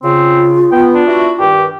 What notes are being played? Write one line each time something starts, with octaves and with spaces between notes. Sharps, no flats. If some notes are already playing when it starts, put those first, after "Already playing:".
C#3 C4 F4
B3 G5
D4
E4 F#4
G2 D#3 G4